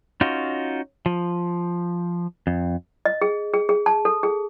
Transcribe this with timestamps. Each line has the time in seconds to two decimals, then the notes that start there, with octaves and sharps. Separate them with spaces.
0.21 C#4 D#4 F4 F#4
1.06 F3
2.47 F2
3.05 D#5
3.21 G#4
3.54 G#4
3.69 G#4
3.86 A5
4.05 A4
4.23 G#4